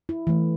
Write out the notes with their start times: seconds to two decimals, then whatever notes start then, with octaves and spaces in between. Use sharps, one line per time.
0.09 E4
0.27 E3 A3